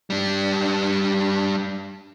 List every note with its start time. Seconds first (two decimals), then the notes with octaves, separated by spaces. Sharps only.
0.10 G3 D4